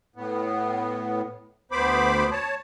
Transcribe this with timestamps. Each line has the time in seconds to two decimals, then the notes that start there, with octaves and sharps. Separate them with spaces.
0.16 A2 B3
1.71 D2 B3 C5 B5 D6
2.32 C#5 A5